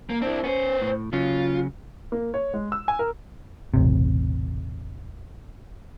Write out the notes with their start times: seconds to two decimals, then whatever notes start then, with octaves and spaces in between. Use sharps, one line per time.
0.10 A#3
0.22 C4 D4 E4
0.44 B3 C#4 C5
0.82 A2
1.13 C#3 F#3 C#4 F4
2.12 A#3
2.34 C#5
2.54 G#3
2.72 E6
2.88 G#5
2.99 A#4
3.74 E1 A1 C3